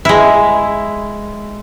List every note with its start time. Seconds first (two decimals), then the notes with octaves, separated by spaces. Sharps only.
0.05 G#3 E4